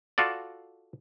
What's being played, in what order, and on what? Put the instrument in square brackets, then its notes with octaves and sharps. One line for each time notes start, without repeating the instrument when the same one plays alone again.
[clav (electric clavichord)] F4 F#4 A4 D5